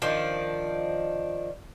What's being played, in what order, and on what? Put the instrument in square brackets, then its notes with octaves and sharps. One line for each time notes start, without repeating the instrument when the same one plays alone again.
[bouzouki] D#3 F3 D4